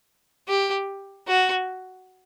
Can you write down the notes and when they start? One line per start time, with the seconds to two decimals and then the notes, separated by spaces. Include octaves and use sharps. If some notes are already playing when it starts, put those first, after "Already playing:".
0.48 G4
1.27 F#4